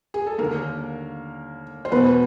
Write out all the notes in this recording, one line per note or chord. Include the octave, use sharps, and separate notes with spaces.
G#4
A4
D#2 D3 A#3 A#4
C5
E2 B2 B3 B4